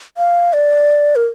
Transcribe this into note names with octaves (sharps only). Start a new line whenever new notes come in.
F5
D5
A#4